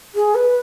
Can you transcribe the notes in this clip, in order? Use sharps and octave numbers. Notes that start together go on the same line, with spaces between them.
G#4
B4